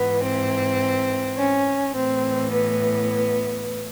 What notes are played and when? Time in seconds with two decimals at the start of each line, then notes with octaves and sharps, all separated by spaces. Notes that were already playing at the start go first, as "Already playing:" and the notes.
Already playing: G#2 E3 B3
0.23 C4
1.37 C#4
1.94 A2 E3 C4
2.52 B3